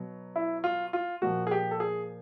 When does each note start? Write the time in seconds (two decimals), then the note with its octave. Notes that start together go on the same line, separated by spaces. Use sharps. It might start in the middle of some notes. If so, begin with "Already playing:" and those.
Already playing: B2 F#3
0.36 E4
0.64 F4
0.93 F4
1.22 A#2 F3 F#4
1.47 G#4
1.51 G4
1.71 A4
1.80 G#4